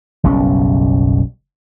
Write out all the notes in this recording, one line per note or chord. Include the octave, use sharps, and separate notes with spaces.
F#1 B1 G3 C#4